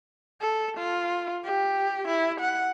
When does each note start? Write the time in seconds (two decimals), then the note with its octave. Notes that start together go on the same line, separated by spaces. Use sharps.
0.41 A4
0.77 F4
1.44 G4
2.08 E4
2.40 F#5